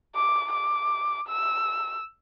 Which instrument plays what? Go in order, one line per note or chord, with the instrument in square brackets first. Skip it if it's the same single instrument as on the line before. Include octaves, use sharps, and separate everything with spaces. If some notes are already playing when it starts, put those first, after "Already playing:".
[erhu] D6
D6
E6